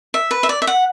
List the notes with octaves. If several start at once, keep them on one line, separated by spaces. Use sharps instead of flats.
E5
B4
E5
D5
E5
F#5